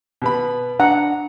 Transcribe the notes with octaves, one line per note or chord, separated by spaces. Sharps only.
B2 B3 B5
D4 F#5 A#5